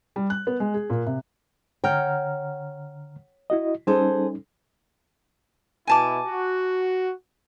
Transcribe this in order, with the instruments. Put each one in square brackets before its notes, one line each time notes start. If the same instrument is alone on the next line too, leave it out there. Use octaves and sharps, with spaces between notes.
[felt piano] G3
F#6
B3
G#3
G#4
A#2
C3
[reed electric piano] D3 A#5 F6 [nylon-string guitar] C#5 F#5 G5
[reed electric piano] E4 F#4 D#5
[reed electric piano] G3 C#4 D#4 [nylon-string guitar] G#4 A4 C5
[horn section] B2 E4 [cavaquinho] G#5 A5 D6
[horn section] F#4